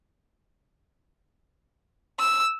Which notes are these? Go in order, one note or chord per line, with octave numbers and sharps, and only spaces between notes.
E6